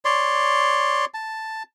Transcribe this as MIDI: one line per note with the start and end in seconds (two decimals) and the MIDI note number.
0.05 1.05 73
0.05 1.05 74
0.05 1.05 84
1.14 1.63 81